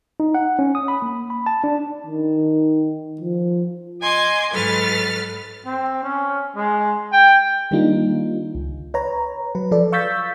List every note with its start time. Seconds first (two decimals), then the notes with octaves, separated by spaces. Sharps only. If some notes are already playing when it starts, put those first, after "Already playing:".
0.20 D#4
0.35 F#5
0.59 C#4
0.75 D#6
0.88 B5
1.02 A#3
1.30 B5
1.46 A5
1.64 D4
2.07 D#3
3.21 F3
4.01 D#5 G#5 C6 D6
4.53 G#2 F#3 A4 B4 F6 A6
5.66 C4
6.03 C#4
6.56 G#3
7.12 G5
7.71 D#3 G3 A#3 D4 D#4 F4
8.55 C#2
8.94 B4 C#5 A#5
9.55 F#3 B4
9.71 F3 A4 D5
9.92 F5 C#6 E6 G6 A6 B6